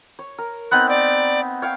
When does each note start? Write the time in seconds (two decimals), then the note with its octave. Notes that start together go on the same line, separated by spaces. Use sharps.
0.19 C#5
0.38 A#4
0.71 B3 C4 D#4 F#6
0.89 D5
1.62 C#5 F5 G5